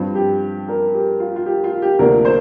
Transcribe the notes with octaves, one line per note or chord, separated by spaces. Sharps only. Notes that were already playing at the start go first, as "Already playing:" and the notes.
Already playing: G2 F3 C4
G4
A#4
G4
F4
F4
G4
F4
G4
D2 C3 F3 A#3 D4 A#4
C5